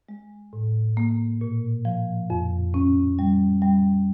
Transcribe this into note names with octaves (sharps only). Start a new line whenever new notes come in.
G#3
A2
A#3
A#2
F3
F2
C#4
G3
G3